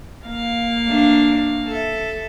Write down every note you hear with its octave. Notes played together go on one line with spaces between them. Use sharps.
A#3 F5
A3 D4
A4 E5